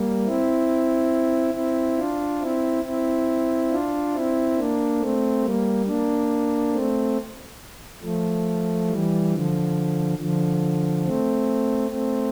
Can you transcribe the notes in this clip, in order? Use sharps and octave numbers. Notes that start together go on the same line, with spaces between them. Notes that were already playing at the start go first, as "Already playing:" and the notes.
Already playing: G3 A#3
C4 E4
C4 E4
D4 F4
C4 E4
C4 E4
D4 F4
C4 E4
A#3 D4
A3 C4
G3 A#3
A#3 D4
A3 C4
F3 A3
E3 G3
D3 F3
D3 F3
A3 C4
A3 C4